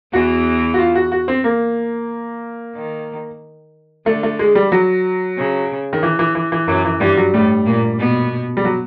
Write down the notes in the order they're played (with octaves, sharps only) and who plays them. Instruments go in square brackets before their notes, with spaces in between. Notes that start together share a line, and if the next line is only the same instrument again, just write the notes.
[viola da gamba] E2 E3 [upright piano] F#4
[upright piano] F#4
F4
F#4
F#4
C4
A#3
[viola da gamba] D#3
[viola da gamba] D3 [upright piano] A3
[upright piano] A3
G#3
G3
F#3
[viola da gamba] C#3
[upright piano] D#3
E3
E3
E3
E3
[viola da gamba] F#2 F#3 [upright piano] E3
[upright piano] E3
[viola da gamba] G2 G3 [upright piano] E3
[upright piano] F#3
[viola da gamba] A2 A3 [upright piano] G3
[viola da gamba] A#2 A#3
B2 B3
[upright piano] G3
F#3